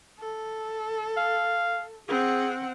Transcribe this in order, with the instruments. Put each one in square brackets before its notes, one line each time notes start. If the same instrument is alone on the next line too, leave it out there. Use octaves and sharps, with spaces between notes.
[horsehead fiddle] A4
[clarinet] F5
[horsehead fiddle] C4 F#5 [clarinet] G#4